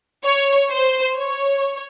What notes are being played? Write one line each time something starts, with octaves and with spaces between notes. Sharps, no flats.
C#5
C5
C#5